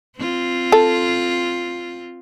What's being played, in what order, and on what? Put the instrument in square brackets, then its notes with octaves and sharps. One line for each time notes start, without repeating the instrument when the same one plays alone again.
[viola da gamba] C4 F4
[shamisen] A4